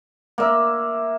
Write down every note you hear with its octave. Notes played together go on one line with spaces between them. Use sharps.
A#3 E5